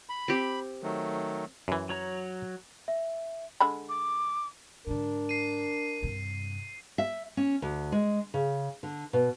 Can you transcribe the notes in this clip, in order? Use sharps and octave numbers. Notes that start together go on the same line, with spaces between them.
B5
C4 G4
D#3 F#3 A3
F#2 E3
F#3 C#5 A#5
E5
D3 G#3 B5
D6
G#2 D3 D4 A#4
C7 D#7
G2 C3
E5
C#4
D2
G#3
C#3
D3
B2